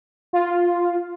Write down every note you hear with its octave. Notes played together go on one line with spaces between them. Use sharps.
F4